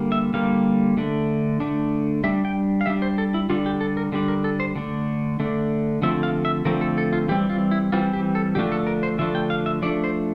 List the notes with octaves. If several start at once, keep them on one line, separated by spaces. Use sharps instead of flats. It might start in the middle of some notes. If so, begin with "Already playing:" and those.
Already playing: D3 G3 A#3
E5
D3 G3 A#3 F5
D3 A3 D4
D3 A3 D4
G3 D4 E5
G5
F5
G3 D4 E5
C5
A4
E4
D3 G3 D4 F4
G4
A4
A#4
D3 G3 D4
A#4
A4
C5
D3 A3 D4
D3 A3 D4
D3 F3 A3 C4 E5
F5
E5
D3 F3 A3 C4 A#4
A4
A4
F4
E3 G3 C4 G4
F4
E4
E3 G3 C4 F4
G4
A4
D3 F3 A3 D4 G4
A4
A#4
C5
D3 F3 A3 D4 E5
G5
F5
E5
F3 A3 D4 D5
C5